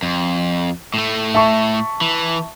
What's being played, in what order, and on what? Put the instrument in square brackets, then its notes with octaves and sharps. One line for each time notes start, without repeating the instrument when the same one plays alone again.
[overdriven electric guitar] F2
A2 A3
[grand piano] E5 A5 C#6
[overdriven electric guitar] E3